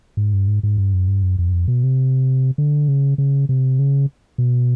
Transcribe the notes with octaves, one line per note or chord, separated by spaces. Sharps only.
G#2
G2
G#2
G#2
G2
F#2
G2
F#2
F2
F#2
F2
B2
C3
D3
C#3
C#3
C3
C#3
B2